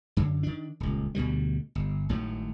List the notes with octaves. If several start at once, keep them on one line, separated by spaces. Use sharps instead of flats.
F#2 D3
D#3 D4
D#1 C#2
D2 B2 D3 G3
G1
G#1 A2 D#3 F#3